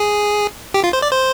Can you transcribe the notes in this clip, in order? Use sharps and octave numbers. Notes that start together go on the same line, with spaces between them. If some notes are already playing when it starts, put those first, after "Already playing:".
Already playing: G#4
G4
F4
C5
D5
C5